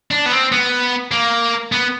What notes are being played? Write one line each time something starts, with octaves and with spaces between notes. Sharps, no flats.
D4
B3
C4
B3
A#3
B3